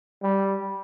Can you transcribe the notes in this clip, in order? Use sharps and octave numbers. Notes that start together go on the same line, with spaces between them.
G3